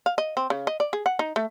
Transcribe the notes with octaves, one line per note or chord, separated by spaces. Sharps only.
F5
D#5
C4
C#3
D#5
D5
G#4
F#5
D#4
A3